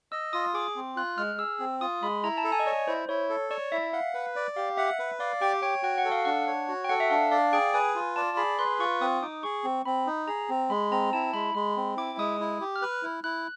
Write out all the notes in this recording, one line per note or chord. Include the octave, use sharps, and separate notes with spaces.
D#5 E6
F4 D#6
G#4 D6
C4
F4 F#6
G#3 F6
G#4 E6
C4
F4 D#6
G#3 B5
E4 A#5
A5
A4
G#5
D#5
C#5 D5
E4 C5
E4 C#5
A4
C#5 D5
E4 E5
F5 F#5
B4
D5
G4 F5
E5 F#5
B4
D5 F5
G4 G5
C#5 G5
F#4 G5
F#5
A4
F5
D4 F#5
C#5
F#4
G5
A4 F#5
E5
D4 F5
D5 F5
G#4 G5
B4 G#5
F4
D5 A5
G#4 B5
B4 C6
F4 C#6
C4 D#6
D#4 D6
G#4 C#6
C4
C4 B5
D#4
G#4 A#5
C4
G#3 B5
C4 A#5
E4 A5
G#3 B5
G#3 B5
C4
E4 D6
G#3 D#6
E4
G4
F6
B4 F#6
E4
E4 F#6